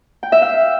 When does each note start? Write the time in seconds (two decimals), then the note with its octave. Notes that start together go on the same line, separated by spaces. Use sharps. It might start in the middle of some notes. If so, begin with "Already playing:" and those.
0.23 G5
0.32 E5
0.42 F5